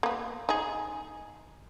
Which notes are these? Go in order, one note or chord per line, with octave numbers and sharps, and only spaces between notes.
A#3 B3
D#4 G#4